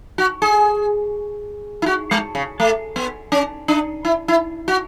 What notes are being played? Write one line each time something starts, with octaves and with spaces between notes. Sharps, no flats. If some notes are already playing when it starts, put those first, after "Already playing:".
F#4
G#4
E4
F#4
G#3
C#3
A3
B3
C#4
D4
E4
E4
F#4